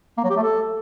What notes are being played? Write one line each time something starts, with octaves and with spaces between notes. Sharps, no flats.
A#3
F#3
G4
A3
A4